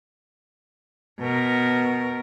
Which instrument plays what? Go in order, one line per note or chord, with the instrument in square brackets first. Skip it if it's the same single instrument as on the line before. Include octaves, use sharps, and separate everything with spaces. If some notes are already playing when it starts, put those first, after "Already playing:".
[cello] B2 A#4